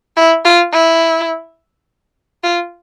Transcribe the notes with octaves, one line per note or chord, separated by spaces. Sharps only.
E4
F4
E4
F4